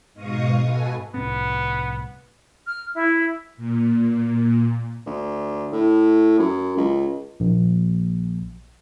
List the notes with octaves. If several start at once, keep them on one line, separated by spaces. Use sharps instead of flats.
G#2 B2 D#5 F5 C#6 D#6
F#4 A4 B4 G#5
C2 A2 B3 C4
F6
E4
A#2
D2
A2
F#2
C#2
A#1